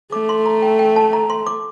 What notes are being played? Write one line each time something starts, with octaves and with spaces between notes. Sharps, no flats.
A3 D6
C6
A#5
G5
G5
A5
A#5
C6
D6